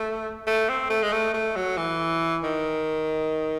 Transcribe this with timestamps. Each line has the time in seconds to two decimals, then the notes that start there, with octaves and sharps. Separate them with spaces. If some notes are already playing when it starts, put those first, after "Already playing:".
Already playing: A3
0.47 A3
0.69 C4
0.90 A3
1.03 G#3
1.12 A3
1.34 A3
1.56 F#3
1.77 E3
2.43 D#3